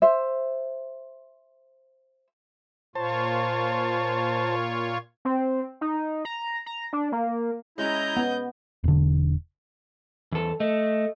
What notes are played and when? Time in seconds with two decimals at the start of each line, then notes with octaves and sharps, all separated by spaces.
0.02 C5 E5
2.95 A#2 F4 C5 C#5 A5
5.25 C4
5.81 D#4
6.25 A#5
6.66 A#5
6.93 D4
7.12 A#3
7.78 G#3 C#4 E4 D#5 A#5 G6
8.17 B3
8.84 E1 D3
10.32 E2 A4
10.60 A3 D#5